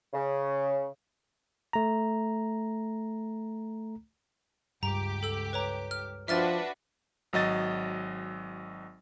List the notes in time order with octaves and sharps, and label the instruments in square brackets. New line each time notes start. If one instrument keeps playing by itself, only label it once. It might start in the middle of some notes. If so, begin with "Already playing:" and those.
[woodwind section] C#3
[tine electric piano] A3 A#5
[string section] C#2 G4 D6 [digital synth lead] G2 [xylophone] A#5
[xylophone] A4 E6
B4 C#5 A#5
F6
[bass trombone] F3 [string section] D4 F#4 B4 [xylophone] E5 F6 A6
[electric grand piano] G#1 F#3 D#5 A6